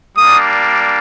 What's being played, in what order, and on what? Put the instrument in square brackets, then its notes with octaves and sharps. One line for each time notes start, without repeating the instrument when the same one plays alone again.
[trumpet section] G3 A#3 D4 D#6